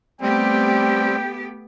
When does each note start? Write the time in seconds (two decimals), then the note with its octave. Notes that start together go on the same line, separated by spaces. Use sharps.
0.21 G3 A3 B3 C4 G4 G5